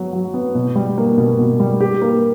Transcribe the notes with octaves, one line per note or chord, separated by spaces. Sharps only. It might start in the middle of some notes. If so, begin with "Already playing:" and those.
Already playing: F#3 B3 F#4
F#3
B3
B2
G3
A#3
B2
B2
G3
G4
A#3